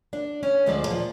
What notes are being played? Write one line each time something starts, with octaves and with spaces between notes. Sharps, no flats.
D4
C#4
D2 D3 F3 G#3 A3 D5
A#2 F3